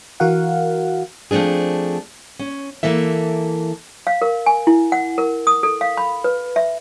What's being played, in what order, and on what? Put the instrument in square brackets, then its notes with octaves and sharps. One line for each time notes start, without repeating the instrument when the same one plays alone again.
[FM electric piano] E3 F#4 A#4 F5 F#5
[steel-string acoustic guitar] F3 A3 C4 D4 G#4
C#4
E3 A#3 A4 E5
[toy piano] F5
A#4
G#5
E4
F#5
A#4
D#6
A4
F5
B5
B4
E5